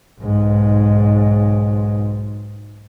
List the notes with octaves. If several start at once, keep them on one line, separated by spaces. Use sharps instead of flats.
B1 G#2